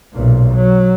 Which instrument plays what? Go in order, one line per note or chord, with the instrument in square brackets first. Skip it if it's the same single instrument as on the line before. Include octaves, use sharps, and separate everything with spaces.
[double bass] B1 A#2
F#3